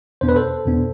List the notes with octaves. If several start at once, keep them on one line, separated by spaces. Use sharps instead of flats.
E2 B2 B3 D4 C5
B4
A4 C5
E2 B2 B3 D4